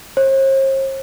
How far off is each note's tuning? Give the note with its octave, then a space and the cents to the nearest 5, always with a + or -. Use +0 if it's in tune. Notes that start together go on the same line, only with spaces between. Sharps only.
C5 +45